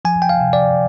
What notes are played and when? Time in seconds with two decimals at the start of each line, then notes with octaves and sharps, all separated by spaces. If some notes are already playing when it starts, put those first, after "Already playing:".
0.05 F3 G#5
0.22 G5
0.29 F5
0.41 C3
0.53 D5